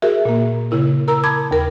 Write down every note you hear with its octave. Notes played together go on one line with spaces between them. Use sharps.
F#4 G#4 A#4 E5
A#2 A#3
C#3 E4 A#4
A#4 A#5 E6
A5 B5 D6 D#6 G#6
D#2 A#4